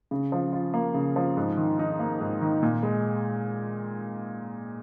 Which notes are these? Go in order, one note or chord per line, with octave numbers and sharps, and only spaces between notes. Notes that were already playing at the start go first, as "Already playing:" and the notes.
C#3
F3
F4
A#3
C#3
F3
G#2
D#3
D#4
A#3
G#2
D#3
A#2
G#3